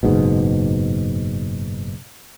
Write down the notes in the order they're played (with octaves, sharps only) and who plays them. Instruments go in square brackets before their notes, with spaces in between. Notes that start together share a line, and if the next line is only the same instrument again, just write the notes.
[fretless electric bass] F#1 G#2 B2